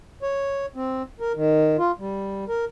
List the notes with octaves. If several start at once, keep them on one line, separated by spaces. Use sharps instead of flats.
C#5
C4
A#4
D#3
F4
G3
A#4